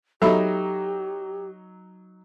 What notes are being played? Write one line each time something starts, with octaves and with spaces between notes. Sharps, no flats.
F#3 D#4 G4 A4 E5 B5